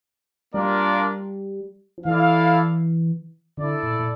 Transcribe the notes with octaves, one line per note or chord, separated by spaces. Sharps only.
G3 A#3 D4 F4 A#4 D5
F3
E3 E4 A4 D5 F5
D3 E4 A4 D5
A#2
A#2